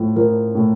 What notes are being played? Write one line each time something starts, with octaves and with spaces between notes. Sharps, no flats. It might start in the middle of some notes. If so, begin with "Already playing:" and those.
Already playing: A2 F3
F3 A#4
A2